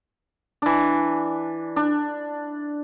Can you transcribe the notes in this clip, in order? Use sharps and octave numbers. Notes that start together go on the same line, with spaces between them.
E3 D4
D4